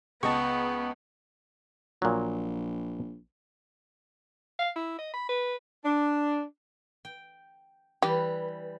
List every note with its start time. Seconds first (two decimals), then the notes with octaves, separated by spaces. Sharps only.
0.23 C#2 B3 D#5 A5 C#6
2.02 A#1 A#2 F#3
4.59 F5
4.76 E4
4.99 D#5
5.14 B5
5.29 B4
5.84 D4
7.05 G5
8.02 E3 G3 G4 B4